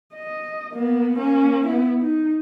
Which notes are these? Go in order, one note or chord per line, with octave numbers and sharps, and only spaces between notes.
D#5
A#3 B3
A#3 C#4
B3 E4
D#4